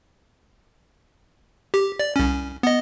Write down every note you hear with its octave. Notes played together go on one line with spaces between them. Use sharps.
G4
D5
C2 C#4
B3 D#5